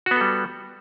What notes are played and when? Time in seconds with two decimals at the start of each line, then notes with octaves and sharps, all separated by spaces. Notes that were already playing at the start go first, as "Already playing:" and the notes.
0.06 F#4
0.11 B3
0.16 A4
0.21 G3